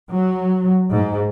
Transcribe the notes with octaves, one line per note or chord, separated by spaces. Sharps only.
F#3
G#2